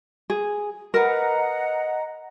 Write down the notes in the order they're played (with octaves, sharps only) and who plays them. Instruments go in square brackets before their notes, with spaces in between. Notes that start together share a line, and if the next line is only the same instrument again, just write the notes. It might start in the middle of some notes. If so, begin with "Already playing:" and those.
[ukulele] G#4
[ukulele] A#4 B4 [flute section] D#5 F#5 A#5